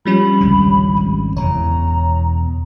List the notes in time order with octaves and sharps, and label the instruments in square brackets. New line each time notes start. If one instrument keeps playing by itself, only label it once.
[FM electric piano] F3 G3 C#4 [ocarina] B5
[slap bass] G#1 C#2 D3
G#1
[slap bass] E1 E2 C#3 [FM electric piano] C#5 [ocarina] A#5